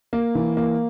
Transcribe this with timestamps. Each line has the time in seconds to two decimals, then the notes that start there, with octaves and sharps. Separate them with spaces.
0.13 A#3
0.35 E3
0.57 A#3